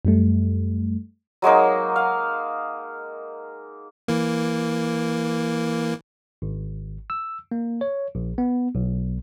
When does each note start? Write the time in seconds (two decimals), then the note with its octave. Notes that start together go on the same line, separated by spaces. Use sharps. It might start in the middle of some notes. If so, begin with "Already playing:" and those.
0.05 F#2 G3 A3
1.42 F#3 G#3 A#3 D#4
1.96 F5
4.08 E3 A#3
6.42 G#1
7.10 E6
7.52 A#3
7.81 C#5
8.15 A#1
8.38 B3
8.75 B1